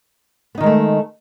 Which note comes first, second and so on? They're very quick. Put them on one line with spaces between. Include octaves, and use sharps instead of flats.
B3 D#4 D#3 G#3 A3